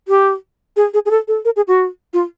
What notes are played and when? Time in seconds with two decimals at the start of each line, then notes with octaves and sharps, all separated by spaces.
0.08 G4
0.77 G#4
0.94 G#4
1.06 G#4
1.11 A4
1.28 A4
1.45 A#4
1.56 G#4
1.68 F#4
2.13 F4